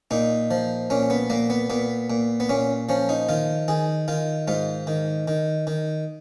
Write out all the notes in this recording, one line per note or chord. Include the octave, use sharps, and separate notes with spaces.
A#2 D#4
F3
A#2 C#4
B3
A#2 A#3
B3
A#2 B3
A#2
B3
A#2 C#4
F3 C#4
D#4
D#3 F4
D#3 G#4
D#3 F4
G#2 F4
D#3
D#3
D#3